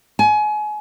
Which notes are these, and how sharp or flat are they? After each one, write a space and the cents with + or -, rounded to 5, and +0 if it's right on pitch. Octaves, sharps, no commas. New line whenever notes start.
G#5 +30